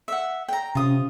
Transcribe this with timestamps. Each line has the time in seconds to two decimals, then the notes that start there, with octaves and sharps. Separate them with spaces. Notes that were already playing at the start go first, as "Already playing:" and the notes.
0.08 E5 F#5
0.48 G5 A#5
0.75 C3 C#4 F4 D#6